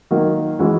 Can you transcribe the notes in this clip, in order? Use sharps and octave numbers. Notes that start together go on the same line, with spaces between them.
D#3 F#3 A#3
E3 G#3 C#4 F#4